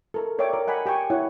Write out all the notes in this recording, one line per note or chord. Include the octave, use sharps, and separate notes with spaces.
A4 A#4
A#4 C#5 D5 E5 G5 D6
A#4
D#5 F#5 G#5 B5
G4 G5 G#5 C#6
E4 C#5 F#5